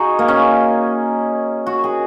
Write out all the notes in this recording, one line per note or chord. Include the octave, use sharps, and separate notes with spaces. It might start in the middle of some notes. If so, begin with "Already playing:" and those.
Already playing: D#4 F#4 G#4
A#3
C#4
F#4
G#4